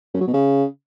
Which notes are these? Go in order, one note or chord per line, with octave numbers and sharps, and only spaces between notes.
F#2
F#3
B2
C#3